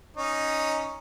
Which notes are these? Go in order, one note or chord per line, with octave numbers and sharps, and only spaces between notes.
C#4 D#4 C#5